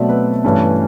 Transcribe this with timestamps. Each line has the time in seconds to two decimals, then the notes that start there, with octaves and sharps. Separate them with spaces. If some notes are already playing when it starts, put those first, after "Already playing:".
Already playing: B2 F#3 A3 C4 D5 E5
0.09 B4
0.44 G2 E3 A3 C#4